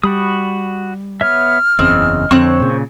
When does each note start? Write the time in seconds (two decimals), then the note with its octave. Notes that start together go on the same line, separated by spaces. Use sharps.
0.03 G3 F#4 B5 D#6
1.21 B3 C#5 E5 F6
1.79 F#1 E2 C#3 C4 D#5
2.31 F2 D3 C4 C5 C#5 C#6 F#6
2.60 A#2 C#3